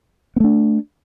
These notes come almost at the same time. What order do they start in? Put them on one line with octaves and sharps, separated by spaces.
B3 A3 D4